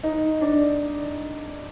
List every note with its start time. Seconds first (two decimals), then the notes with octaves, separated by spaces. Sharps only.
0.03 D#4
0.41 D4